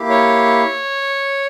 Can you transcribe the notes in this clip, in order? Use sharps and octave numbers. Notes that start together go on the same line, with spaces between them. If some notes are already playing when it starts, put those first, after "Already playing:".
Already playing: A#3 E4 G4
C#5